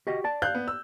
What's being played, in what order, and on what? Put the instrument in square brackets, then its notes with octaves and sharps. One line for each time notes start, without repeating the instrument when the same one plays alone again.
[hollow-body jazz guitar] F#4 G4 D#5
D5 A5
[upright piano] F5 F#6 G6
B3
E6